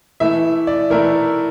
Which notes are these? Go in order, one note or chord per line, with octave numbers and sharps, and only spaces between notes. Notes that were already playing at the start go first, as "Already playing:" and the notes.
E3 A3 E4 E5
D5
E3 A3 E4 A#4